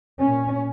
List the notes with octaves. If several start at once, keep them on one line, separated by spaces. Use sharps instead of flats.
A#2 C#4